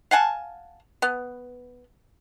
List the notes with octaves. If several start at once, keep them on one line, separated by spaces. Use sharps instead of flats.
F5 F#5 G#5 A5
B3